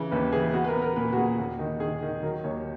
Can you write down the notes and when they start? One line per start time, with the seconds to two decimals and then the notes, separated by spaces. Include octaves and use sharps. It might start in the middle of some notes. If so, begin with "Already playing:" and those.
Already playing: C#3 E3
0.11 D#2 B4
0.32 E3 G#4
0.53 B3 F#4
0.64 B4
0.68 A#4
0.75 B3
0.82 A#4
0.96 A#2 B4
1.13 F#4
1.17 A#2 G#4
1.39 D#2
1.59 D#3
1.80 D#3 G#4
2.02 D#3
2.22 F#3 A#4
2.44 D#2 C#5